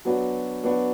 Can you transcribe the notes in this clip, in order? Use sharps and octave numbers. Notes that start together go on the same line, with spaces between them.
F#3 B3 D4 F#4
F#3 B3 D4 F#4